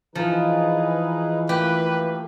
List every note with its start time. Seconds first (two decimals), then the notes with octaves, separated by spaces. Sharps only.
0.15 E3 F3 D#4 G#4 B4
1.49 A3 A#3 G4 B4